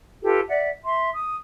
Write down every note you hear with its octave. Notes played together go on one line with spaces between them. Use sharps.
F4 G4 A4 B4
D5 E5 F#5
E5 C6
D#6